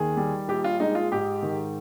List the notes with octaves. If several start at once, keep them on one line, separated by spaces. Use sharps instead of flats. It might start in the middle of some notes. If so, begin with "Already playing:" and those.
Already playing: D#2 D#3 G#4
G3
A#1 G4
F4
G#3 D#4
F4
G#2 G4
D#3